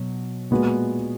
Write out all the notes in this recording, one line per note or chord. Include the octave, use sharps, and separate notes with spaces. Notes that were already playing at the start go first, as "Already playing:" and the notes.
Already playing: B2 F#3
A#2 G#3 B3 F#4